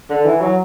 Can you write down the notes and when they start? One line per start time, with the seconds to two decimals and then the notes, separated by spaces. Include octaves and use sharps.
0.10 D3
0.25 E3
0.41 F#3